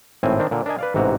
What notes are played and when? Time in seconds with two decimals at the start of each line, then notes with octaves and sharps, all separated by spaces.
0.23 G#1 A2 C4 G#5
0.39 D#3 C4 D4
0.51 A#2 D3
0.66 D4 A#4 D#5 G#5
0.79 B4 D5 F5
0.94 A1 G#2 C3 F#4 A#5